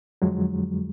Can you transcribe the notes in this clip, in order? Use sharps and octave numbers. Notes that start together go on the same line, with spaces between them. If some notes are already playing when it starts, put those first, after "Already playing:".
F2 D3 F3 F#3 G#3